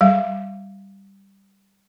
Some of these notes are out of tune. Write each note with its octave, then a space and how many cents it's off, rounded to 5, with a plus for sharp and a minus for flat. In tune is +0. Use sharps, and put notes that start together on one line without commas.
G3 +0 F5 +0